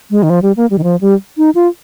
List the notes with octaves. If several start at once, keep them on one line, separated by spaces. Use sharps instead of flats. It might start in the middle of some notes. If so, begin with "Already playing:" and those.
G#3
D#3
F3
G3
A#3
G3
D#3
F3
G3
D#4
F4